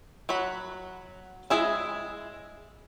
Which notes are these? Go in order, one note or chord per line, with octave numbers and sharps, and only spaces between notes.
F#3 F#5 B5
G#3 E4 G#4 E5